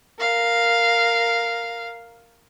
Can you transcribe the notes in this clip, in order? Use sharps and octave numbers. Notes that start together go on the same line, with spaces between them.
A#4 F5